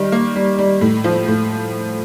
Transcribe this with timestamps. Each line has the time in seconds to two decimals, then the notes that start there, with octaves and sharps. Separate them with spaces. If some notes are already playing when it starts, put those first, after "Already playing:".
Already playing: D#3 G3
0.12 A#3
0.36 G3
0.59 G3
0.81 A2
1.04 F3
1.27 A2